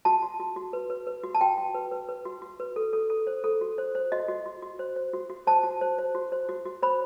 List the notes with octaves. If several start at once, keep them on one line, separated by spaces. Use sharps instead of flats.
F#4 A5
F#4
F#4
F#4
B4
B4
B4
F#4
A5
F#4 G5
F#4
B4
B4
B4
F#4
F#4
B4
A4
A4
A4
C5
A4
F#4
C5
C5
F#4 D#5
F#4
F#4
F#4
C5
C5
F#4
F#4
C5 A5
F#4
C5
C5
F#4
C5
F#4
F#4
C5 B5